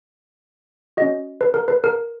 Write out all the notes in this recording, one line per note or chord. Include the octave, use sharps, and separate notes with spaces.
C#4 F#4 D#5
B4
A#4
B4
A#4